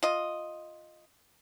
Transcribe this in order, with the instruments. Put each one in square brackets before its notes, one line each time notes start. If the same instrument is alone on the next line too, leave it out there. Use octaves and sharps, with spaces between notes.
[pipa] F4 D#5